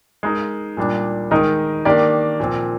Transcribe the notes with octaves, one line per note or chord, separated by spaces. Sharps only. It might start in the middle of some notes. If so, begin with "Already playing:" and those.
G#3 D#4 A#4
A#2 G3 D4
D#3 G#3 D#4 A#4 D#5
D#3 A#3 D4 G4 D5
A#2 F3 C4